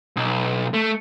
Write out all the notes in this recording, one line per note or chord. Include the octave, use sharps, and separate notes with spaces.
B1
A3